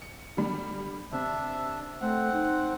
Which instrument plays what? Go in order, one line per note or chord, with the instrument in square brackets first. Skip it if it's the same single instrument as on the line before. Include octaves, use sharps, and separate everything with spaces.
[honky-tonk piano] C#7
D3 G3
[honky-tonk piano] C3 [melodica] D4 E5
[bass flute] A3 [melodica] C4 F#5
[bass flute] D#4